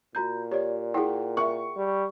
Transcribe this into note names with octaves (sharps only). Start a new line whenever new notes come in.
A#2 F#4 A#5 G6
G4 C#5 D5
E4 F#4 G#4 F#5 G5
A#4 E5 C#6
G3